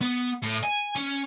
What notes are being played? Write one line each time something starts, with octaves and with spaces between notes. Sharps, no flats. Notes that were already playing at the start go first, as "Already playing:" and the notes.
B3
A2
G#5
C#4